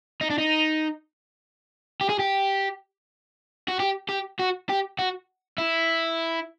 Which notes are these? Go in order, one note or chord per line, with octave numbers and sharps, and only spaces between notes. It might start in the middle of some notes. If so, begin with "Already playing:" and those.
D#4
D4
D#4
G4
G#4
G4
F#4
G4
G4
F#4
G4
F#4
E4